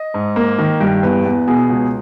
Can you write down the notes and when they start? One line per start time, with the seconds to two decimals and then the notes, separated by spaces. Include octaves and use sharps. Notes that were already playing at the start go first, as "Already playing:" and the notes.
Already playing: D#5
0.14 G#2
0.36 A#3
0.58 D#3
0.80 G2
1.03 E2 B4
1.25 E2
1.47 B2 G#4
1.69 C#2